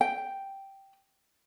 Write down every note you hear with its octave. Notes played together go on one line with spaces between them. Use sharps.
G5